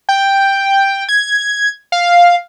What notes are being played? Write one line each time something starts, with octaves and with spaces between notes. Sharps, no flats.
G5
G#6
F5